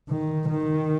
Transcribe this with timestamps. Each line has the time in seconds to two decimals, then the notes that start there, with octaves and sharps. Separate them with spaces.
0.09 D#3
0.49 D#3